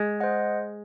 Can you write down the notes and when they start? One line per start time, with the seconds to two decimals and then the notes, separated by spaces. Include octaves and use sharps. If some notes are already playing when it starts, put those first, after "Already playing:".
Already playing: G#3
0.20 C5 D#5 F#5